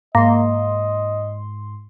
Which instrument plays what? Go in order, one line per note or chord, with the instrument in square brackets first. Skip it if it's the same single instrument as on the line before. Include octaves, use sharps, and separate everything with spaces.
[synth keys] G#2 C6 [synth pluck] A#3 [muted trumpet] D#5